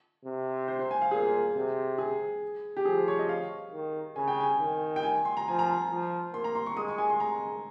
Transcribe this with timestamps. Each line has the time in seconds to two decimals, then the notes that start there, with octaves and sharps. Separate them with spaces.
0.25 C3
0.68 C5
0.79 C5
0.91 G#5
1.02 F5
1.11 A#2 G#4
1.55 C3
1.98 G#4
2.77 G4
2.85 F3 G#4
2.97 C5
3.08 C#5
3.19 D#5
3.29 F5
3.73 D#3
4.16 C#3 G#5
4.28 G5
4.41 G#5
4.59 D#3
4.96 G5
5.03 G#5
5.25 C6
5.37 A#5
5.47 F3 G#5
5.59 A#5
5.90 F3
6.33 A#3 C6
6.44 A#5
6.55 C6
6.66 C#6
6.77 G#3 D#6
6.88 C#6
6.98 G#5
7.10 C6
7.20 G#3 A#5